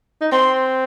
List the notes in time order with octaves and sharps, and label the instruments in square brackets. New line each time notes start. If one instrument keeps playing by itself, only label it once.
[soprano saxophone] D#4
[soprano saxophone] C4 [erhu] C6